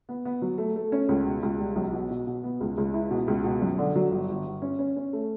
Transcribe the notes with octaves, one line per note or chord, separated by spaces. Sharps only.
B3
B3
F#3
A3
A3
C#4
C#2
B2
C#2
G3
B1
B2
B2
B2
B3
C#2
C#2
E4
B2
C#2
B2
F#2
D3
F#3
G1
G1
G1
C#4
C#4
C#4
A3